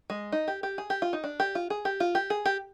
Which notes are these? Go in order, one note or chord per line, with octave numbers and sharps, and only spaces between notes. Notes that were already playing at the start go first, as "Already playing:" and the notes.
G#3
D#4
G4
G4
G#4
G4
F4
D#4
D4
G4
F4
G#4
G4
F4
G4
G#4
G4